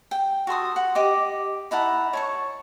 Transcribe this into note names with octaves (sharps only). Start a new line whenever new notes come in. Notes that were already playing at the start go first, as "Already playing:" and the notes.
G5
F#4 A4 C6 D#6
F#5
G4 D#5 D6
D#4 E4 F#5 A5
C#5 A5 C#6